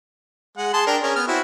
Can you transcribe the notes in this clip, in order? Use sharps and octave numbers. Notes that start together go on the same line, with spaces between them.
G#3 F#5
G#4 A5 C6
D4 A#4 G5
C#4 G#4 A#4
B3 F6
C4 E4 F#4